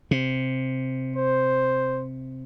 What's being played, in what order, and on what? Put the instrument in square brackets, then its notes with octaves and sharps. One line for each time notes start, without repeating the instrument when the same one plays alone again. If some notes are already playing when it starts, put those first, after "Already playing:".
[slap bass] C3
[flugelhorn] C5